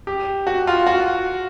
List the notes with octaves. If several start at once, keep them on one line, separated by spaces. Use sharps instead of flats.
G4
F#4
F4
F#4